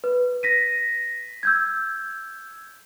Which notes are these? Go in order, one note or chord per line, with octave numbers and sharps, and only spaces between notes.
B4
A#6 B6 D#7
E6 G6 G#6